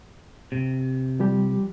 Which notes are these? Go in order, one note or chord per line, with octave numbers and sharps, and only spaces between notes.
C3
F3 G3 G4